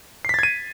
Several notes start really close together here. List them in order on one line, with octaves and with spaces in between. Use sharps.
C7 B6 A6 G#6 D#7